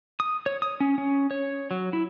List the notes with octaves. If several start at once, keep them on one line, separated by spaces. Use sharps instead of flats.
D#6
C#5
D#6
C#4
C#4
C#5
F#3
E4